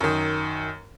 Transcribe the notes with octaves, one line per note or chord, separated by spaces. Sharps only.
F#2 D#3